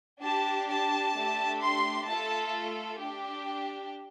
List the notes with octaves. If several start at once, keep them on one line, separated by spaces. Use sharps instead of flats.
D4 G4 A5
A5
A3 D4 G4
C6
A3 F4 A4 A5
D4 G4